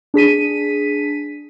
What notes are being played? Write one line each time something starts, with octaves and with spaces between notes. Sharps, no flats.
D4 G#4 B6 D#7